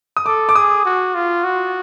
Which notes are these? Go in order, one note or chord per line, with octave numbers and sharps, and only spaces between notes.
D#6
A4 D6
D6
G#4 D#6
F#4
F4
F#4